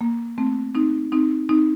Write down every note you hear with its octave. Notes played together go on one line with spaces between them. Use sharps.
A#3
A3 C4
C4 D#4
C4 D#4
C4 D#4